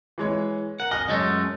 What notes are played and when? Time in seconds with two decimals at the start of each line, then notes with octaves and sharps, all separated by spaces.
0.18 E3 G#3 C#5
0.80 A#4 F#5
0.91 D#5 G#5 F6 F#6
1.09 F#2 G#3 A3 D#5